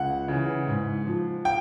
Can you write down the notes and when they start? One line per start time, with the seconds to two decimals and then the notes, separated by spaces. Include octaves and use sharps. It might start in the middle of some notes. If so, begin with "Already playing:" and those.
Already playing: C#2 F#5
0.28 C#3
0.33 E3
0.68 G#2
1.06 F3
1.45 G5